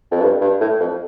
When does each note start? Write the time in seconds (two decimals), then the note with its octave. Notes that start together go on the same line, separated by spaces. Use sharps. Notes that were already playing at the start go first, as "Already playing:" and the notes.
0.11 F2
0.22 G2
0.41 G2
0.61 A2
0.80 F2